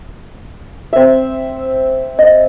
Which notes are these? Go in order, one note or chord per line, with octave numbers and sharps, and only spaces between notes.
C4 E5
D#5